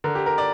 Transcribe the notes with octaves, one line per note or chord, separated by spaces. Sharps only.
D3 A#4
G4
A#4
D5